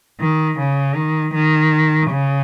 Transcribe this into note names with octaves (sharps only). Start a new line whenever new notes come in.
D#3
C#3
D#3
D#3
C#3